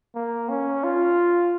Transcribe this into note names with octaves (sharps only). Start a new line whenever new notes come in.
A#3
C#4
F4